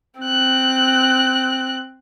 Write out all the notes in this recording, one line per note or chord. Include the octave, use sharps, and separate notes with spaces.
C4 F#6